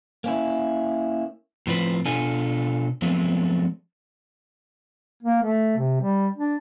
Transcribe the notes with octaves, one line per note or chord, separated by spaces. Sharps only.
A#3 C#4 E4
A2 F3 C4 B4
B2 D4 F4 A4 G#5
F3 F#3 G#3 A3 B3 C4
A#3
A3
C3
G3
D4